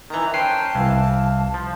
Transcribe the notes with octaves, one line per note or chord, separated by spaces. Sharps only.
D#3 E3 A#5
C#4 B4 C5 G5 A5 C7
C2 E3 F5
F3